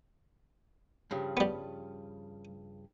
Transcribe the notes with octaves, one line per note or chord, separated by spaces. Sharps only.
G2 C#3 F3
G3 B3